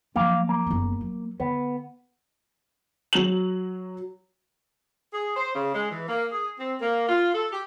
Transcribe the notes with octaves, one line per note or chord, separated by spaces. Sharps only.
F3 F#3 A#3 F5
A#3
F#1 B3
F#3
D3 B3
F#3 F#7
G#4
C5
C#3
G#3
E3
A#3
G#4
C4
A#3
F4
A4
G4